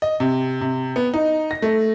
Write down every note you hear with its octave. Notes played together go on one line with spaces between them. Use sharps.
D#5
C3
C3
B3
D#4
A#6
A3